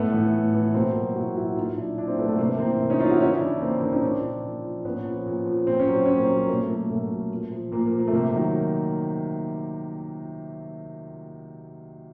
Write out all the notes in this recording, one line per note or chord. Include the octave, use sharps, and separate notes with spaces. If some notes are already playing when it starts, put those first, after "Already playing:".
Already playing: A2 A3 B3
E3
A2
E3
B2 A#3 C4
F#3
B2 E4 F#4
F#3 E4 F#4
A#2 D#4 F4
F#3 D4 E4
A#2 D4 E4
A#3 C4
F#3 A3 B3
A3
C3 A#3
E3 A#3 C4
C3
C#4 D#4
E3 D#4 F4
E4 F#4
C#3 C#4 D#4
D4 E4
E3
C#3 A#3 C4
E3 C4 D4
C#4 D#4
A#2 C4 D4
F3
A#2
F3
A#2 B3 C#4
F3
A#2
F3
A#2 C4
C#4
F#3
C4
A#2 C#4
A#3 C4
F#3
B2 A#3
A3
F#3
A#3
B2 A3
F#3
A#2
F3
A#2 A#3
A#3
F3
A#3
A3
C3 A#3
D#3 F#3